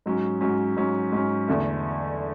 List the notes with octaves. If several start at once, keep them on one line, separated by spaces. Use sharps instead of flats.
G#2 F#3 C#4
G#2 F#3 C#4
G#2 F#3 C#4
G#2 F#3 C#4
E2 D3 A3